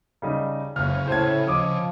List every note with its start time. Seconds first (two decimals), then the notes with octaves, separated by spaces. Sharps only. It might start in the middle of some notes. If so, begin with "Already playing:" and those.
0.22 C#3 G3 D#4
0.76 F#1 C#2 C#3 F6
1.08 A2 C5 G#6
1.47 F3 D#5 D6 D#6